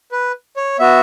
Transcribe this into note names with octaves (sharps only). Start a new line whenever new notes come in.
B4
C#5
B3 F#4 E5